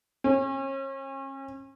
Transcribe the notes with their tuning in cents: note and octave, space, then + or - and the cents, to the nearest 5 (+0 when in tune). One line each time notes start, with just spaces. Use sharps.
C#4 -35